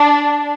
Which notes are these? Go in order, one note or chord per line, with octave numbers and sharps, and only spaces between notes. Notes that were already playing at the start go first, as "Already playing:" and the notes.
Already playing: D4